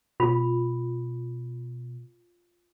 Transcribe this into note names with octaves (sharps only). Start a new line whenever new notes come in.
B2 F4 B5